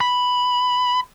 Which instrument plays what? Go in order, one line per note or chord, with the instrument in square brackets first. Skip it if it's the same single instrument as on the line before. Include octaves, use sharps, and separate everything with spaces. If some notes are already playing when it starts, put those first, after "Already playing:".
[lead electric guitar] B5